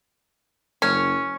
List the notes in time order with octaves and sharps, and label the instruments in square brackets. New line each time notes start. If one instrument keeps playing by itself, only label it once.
[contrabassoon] F#1 [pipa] C#4